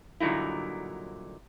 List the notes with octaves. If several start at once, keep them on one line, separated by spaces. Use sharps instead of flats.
G2 A#2 D3 F#3 D#4 E4